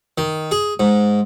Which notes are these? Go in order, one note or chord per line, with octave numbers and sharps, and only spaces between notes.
D#3
G#4
G#2